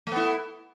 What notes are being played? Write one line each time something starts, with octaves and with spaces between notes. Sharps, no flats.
A3 B3 E4